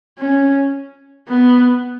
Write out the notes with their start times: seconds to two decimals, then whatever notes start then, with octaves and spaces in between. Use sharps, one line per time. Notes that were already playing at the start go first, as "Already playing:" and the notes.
0.19 C#4
1.28 B3